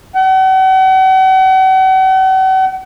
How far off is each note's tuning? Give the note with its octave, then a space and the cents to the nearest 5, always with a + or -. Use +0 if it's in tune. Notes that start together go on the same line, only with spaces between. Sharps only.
F#5 +40